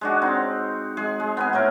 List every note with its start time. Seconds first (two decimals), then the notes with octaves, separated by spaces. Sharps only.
0.01 G#3 D4 F#4
0.22 C4 D#4
0.97 G#3 G#4
1.20 G#3
1.37 B3 A#4 G#5
1.53 A2 A3 A#4